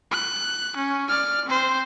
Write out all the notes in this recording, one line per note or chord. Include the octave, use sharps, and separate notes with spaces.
F#6
C#4
D5 F6
C4 C5